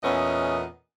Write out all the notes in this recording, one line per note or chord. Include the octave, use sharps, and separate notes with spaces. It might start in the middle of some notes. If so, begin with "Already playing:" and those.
E2 A#2 A3 B3 C#4 D#5